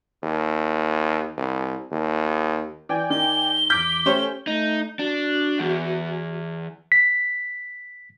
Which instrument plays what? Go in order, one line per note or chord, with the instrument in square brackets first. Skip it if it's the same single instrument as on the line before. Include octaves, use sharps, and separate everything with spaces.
[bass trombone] D#2
C2
D#2
[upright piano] E3 [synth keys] D5 G5 G#5
[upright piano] D#3 [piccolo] G7
[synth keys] E2 D6 B6 [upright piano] G6
[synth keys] A3 C#4 [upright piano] G4 C5 C#5
[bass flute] A3 [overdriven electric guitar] D#4
[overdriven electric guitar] D4 [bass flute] F#4
[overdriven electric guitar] E2
[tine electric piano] B6